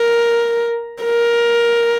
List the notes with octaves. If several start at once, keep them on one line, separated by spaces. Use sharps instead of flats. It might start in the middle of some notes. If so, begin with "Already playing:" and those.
Already playing: A#4
A#4